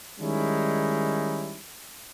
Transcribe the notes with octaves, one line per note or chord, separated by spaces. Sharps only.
D#3 G3 G#3 C#4 D#4 E4